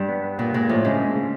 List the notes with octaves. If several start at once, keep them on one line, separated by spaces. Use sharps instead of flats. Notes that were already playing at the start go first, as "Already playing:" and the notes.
Already playing: G2
B3
B3
A#2 B3
A#2 G#3
A2 F3
G#2 C#3
G#3
C#3